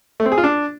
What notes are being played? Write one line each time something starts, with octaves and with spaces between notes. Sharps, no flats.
A3
C4
G#4
F4
D4